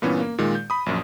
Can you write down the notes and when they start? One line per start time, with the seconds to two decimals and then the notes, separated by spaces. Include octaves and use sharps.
0.02 G2 A#2 E3 B3 C#4
0.20 A#3
0.38 A#2 D#3 G#3
0.55 G6
0.70 B5 D#6
0.86 A#1 F#2